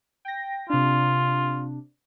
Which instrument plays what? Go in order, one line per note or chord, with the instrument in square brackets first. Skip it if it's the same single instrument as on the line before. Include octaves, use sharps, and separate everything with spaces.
[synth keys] G5 A#6
[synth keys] C3 D4 [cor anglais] F4